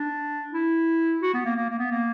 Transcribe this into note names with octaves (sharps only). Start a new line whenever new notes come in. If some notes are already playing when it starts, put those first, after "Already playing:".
Already playing: D4
E4
F#4
B3
A#3
A#3
A#3
B3
A#3